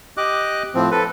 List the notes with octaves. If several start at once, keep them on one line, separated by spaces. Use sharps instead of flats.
G4 D#5 D6 F#6
A2 F3 C4
A4 B4